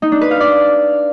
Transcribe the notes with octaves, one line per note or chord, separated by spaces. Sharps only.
D#4
D4
B4
F5
D5